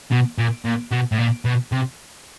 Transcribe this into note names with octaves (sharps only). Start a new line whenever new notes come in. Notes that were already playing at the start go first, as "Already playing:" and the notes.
B2
A#2
A#2
B2
A2
A#2
B2
C3